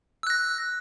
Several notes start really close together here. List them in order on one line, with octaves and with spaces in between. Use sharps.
E6 F#6 A#6